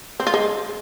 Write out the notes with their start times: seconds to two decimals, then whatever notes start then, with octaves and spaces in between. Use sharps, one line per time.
0.20 C4
0.27 F4
0.34 G#3